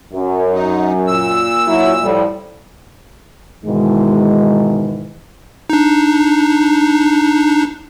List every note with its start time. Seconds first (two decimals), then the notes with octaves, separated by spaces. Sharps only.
0.13 F#2
0.53 D#4
1.07 A#2 E6
1.68 F#3 E4
2.03 A2 F3 G3
3.65 G#2 B2 D#3 E3 G#3
5.70 D4 D#4